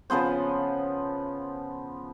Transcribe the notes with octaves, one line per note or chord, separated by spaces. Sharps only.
C#3 F3 B3 C5